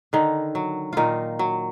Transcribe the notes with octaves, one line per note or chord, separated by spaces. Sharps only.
D3 D#3 D#4
F#3
A#2 D#3 D#4 F4
F#3